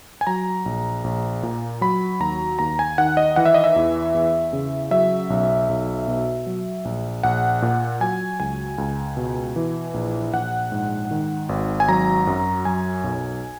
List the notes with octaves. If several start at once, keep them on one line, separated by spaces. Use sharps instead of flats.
G#5
F#3 A#5
A#1
A#1
A#2
F#3 B5
D#2 A#5
D#2 A#5
G#5
D#3 F#5
D#5
E3 F#5
E5
D#5
E5
E2
E2
C#3
F#3 E5
B1
B1
B2
F#3
A#1
A#1 F#5
A#2
F#3 G#5
C#2 G#5
C#2
B2
E3
A#1
A#1 F#5
G#2
D#3
G#1
G#5
F#3 A#5
F#2
F#3 G#5
B1